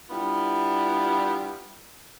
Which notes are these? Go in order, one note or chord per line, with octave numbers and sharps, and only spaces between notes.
G3 B3 D4 E4 F4